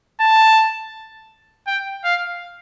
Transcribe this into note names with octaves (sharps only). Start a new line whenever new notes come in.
A5
G5
F5